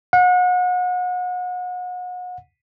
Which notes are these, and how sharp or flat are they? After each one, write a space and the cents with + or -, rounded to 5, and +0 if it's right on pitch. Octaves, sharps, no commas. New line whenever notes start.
F#5 -35